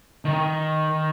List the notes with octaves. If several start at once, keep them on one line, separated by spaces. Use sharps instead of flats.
D#3